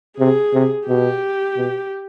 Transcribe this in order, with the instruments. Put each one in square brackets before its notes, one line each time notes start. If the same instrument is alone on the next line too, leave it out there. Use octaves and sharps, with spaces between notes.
[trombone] C3 [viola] G#4
[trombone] C3
[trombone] B2 [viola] G4
[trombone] B2